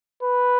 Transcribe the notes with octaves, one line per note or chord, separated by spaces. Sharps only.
B4